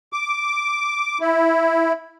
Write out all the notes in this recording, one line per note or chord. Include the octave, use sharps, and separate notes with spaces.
D6
E4